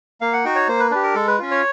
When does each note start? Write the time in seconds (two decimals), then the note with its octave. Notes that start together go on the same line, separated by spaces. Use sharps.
0.21 A#3 F5
0.33 F#5
0.45 D#4 F#4 G5
0.55 C#5
0.68 A#3 C5
0.80 B4
0.91 D4 G4 B4
1.03 A#4
1.14 G#3 A4
1.27 B4
1.39 C#4 F4
1.51 C#5